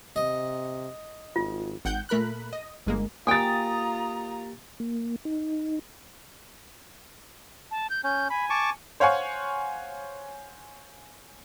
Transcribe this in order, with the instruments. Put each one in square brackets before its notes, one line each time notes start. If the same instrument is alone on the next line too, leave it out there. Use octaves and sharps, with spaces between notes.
[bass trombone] C3 [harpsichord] D#5
[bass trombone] G#1 [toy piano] F4
[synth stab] G#1 F#5 G5 G6
A#2 A3 A#4 B5 F#6
D#5
G1 G#3 A#3
[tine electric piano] A#3 G4 [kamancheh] F4 A#5 [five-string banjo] G5 G#5 [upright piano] D#6 A6
[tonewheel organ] A#3
D#4
[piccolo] A5
G6
[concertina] C#4 [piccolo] G6
[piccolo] G#5 [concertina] B5
[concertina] A5 C#6 D6
[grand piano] C5 C#5 F5 F#5 G#5 C#6